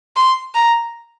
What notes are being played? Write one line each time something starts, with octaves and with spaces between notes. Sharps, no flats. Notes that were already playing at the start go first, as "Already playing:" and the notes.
C6
A#5